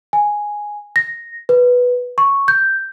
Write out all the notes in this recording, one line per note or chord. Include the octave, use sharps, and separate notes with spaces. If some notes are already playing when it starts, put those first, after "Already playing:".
G#5
A#6
B4
C#6
G6